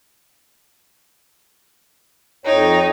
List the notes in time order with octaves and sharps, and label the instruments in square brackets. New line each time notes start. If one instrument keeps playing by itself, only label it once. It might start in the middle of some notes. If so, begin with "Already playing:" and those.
[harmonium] F2 C#5 G5 [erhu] D#4